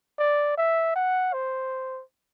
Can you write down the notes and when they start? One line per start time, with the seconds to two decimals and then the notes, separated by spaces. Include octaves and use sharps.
0.19 D5
0.57 E5
0.96 F#5
1.33 C5